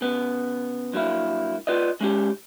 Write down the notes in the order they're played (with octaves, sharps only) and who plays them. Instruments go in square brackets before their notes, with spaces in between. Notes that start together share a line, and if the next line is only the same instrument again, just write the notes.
[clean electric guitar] C#3 B3
G2 F#3 A#3 E4
F4 B4 D5 D#5
G#3 C#4 G4